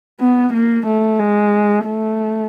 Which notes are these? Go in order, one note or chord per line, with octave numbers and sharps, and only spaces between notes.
B3
A#3
A3
G#3
A3